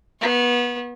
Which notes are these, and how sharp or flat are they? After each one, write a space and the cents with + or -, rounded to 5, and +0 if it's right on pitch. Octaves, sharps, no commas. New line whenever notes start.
B3 -25 C#6 -40